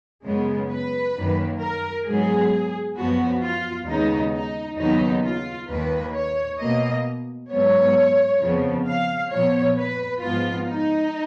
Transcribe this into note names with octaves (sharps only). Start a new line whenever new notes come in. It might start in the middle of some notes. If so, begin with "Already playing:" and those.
F#2 C#3 G#3 B3
B4
F#2 D#3 A#3
A#4
G#2 F#3 B3 G#4
F#2 F3 B3 F#4
F4
D#2 C#3 G#3 B3 D#4
D#4
D#2 C#3 F#3 B3 D#4
F4
D#2 D#3 A#3 B4
C#5
B2 A#3 D#5
G#2 F#3 B3 C#5
F2 C#3 F3 B3
F5
A#2 F3 B3 C#5
B4
G#2 F3 B3 F4
D#4